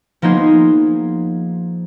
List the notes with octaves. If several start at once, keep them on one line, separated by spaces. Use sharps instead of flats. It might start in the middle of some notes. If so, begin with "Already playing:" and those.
F3 A#3 B3 D#4 G#4 C5